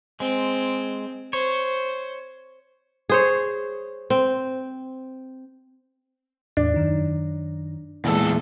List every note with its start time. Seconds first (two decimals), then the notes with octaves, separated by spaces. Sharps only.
0.20 G#3 C4
1.33 C5 C#5
3.09 G#4 C5 C#5
4.10 C4
6.57 E2 A2 D4
6.74 F#2 D#3 D#4
8.05 E2 A#2 E3 G#3 A4